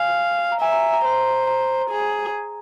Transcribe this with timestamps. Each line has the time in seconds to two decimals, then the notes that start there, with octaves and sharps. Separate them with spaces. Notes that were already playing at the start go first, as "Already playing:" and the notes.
Already playing: F5 G#5
0.52 A#5
0.61 E5 G#5
0.72 A#5
0.94 A#5
1.05 C5
1.47 A#5
1.90 G#4